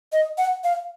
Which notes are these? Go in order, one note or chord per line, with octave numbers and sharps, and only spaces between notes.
D#5
F#5
F5